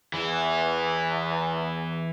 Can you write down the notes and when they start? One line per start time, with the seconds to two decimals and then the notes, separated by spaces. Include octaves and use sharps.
0.14 E2 E3 E4